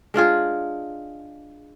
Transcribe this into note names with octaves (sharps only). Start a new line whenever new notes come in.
G#3 D4 F4 G#4